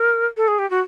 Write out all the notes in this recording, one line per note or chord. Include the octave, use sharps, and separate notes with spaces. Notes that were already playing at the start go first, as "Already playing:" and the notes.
Already playing: A#4
A4
G#4
G4
F#4